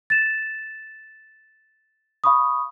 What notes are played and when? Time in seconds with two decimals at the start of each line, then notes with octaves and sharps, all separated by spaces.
0.10 A6 E7
2.24 F5 B5 C#6 D#6